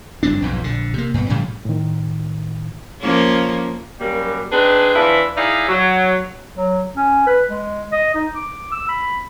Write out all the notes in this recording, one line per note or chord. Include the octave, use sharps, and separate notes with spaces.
F#1 G2 C4 D4
B1 F2 G#2
A#1 D3
C3 A#3
G2 B2
A2 C#3 F3 G3
A2 D#3
F3 A#3 C#4
F#2 G3 A#3
C4 D4 D#4 G#4 B4
E3 F3 D4 E4 B4
D#4 E4 G#4 D5 E5 F5
F#3
F#3
C#4
B4
G#3
D#5
D#4
D6
E6
B5